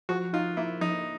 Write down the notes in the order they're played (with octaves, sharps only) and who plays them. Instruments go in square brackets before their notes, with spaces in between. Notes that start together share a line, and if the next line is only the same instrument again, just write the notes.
[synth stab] F3 [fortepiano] F#4
[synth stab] D#4 [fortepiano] F4
[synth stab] A#3 [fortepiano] E4
[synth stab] F3 [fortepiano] D#4